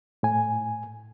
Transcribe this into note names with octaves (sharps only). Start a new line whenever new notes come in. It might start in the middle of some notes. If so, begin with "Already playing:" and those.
A2 G#5